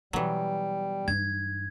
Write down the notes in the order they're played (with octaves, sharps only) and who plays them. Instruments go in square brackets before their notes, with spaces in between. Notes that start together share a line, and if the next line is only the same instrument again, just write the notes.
[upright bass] B2 [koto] E3 F#3 [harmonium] G3
[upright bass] G2 D#4 [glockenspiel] G#6